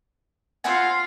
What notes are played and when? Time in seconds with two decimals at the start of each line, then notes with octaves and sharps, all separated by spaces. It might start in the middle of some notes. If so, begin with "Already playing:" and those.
0.64 C4 F4 F5 F#5 G#5